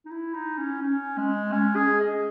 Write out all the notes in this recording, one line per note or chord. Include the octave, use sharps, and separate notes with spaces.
D#4
E4
D#4
C#4
C#4
G#3
C#4
G#4
D#5